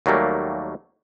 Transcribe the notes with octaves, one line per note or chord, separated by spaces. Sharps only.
D#2 F#3 G3 A3 A#3